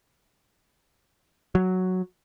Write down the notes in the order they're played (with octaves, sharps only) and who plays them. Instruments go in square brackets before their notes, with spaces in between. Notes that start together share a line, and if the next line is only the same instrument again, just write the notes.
[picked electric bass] F#3